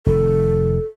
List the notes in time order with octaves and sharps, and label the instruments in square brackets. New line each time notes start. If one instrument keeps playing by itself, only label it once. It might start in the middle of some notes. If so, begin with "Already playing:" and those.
[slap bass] F1 D#3 [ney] A4